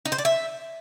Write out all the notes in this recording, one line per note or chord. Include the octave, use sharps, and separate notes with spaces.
D#4
C5
D5
E5